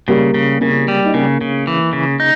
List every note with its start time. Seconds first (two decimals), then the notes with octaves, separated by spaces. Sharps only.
0.08 C#3 G3 A#3
0.34 C#3
0.61 C#3 A#3 C#4
0.88 G3
1.06 D#4
1.14 C#3 A#3 C#4
1.41 C#3
1.67 E3
1.93 C#3
2.20 D#4